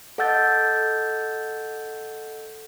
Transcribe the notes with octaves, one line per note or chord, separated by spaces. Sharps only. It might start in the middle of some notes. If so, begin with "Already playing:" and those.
A4 D#5 F#5 E6 G6 A6